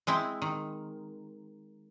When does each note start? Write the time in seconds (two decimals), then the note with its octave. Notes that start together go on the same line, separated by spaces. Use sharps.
0.07 G#3 C4 E4
0.42 D#3